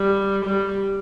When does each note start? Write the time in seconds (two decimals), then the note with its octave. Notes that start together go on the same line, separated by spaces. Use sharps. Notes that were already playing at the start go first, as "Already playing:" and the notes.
Already playing: G3
0.45 G3